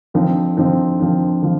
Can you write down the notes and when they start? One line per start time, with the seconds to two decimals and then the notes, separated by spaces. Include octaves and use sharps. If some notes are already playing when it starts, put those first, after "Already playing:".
0.14 D3 F3 C4 D#4
0.57 D3 F3 C4 D#4
1.00 D3 F3 C4 D#4
1.42 D3 F3